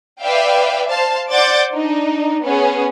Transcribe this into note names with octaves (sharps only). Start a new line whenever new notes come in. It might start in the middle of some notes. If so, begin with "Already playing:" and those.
B4 D5 E5 F5 G5
C5 F5 A5
C5 D5 F#5 D6 G6 A6
D4 D#4
B3 C#4 G#4